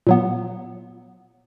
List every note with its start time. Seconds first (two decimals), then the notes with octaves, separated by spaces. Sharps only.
0.07 A#2 F#3 B3